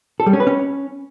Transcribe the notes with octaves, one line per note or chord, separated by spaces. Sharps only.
A4
G3
C#4
B4
C#4